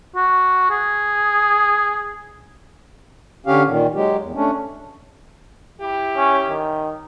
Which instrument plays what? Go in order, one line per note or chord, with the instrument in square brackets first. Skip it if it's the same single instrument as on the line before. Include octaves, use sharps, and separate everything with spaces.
[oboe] F#4
G#4
[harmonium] D3 C#4 G4 F5
A#2 D#3
F#3 G#3 G4
E2
A3 C#4 D4
[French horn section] E4 G4
[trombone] C#4
D#3